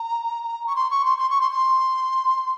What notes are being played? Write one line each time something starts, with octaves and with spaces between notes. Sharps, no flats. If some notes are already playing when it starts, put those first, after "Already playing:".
Already playing: A#5
C#6
C6
C#6
C6
C6
C#6
C6
C6